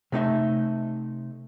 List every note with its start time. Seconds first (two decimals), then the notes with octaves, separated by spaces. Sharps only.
0.12 C3 A3 D#4 E5